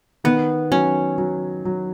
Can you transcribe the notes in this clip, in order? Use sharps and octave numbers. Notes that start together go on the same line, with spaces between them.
D#3 B3
F#3 C#4
F#3
F#3